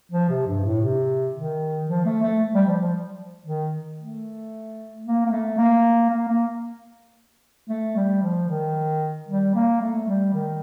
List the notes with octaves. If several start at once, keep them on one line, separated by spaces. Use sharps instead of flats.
F3
C3
G2
A2
C3
D#3
F3
A3
A3
G3
F3
F3
D#3
A3
A#3
A#3
A3
A#3
A#3
A#3
A3
G3
F3
D#3
G3
A#3
A3
G3
D#3